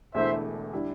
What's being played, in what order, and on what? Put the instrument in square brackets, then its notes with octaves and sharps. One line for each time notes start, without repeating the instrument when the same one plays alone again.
[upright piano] E1 E2 D3 A3 E4 [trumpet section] C5 E5
[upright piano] D3 G3 E4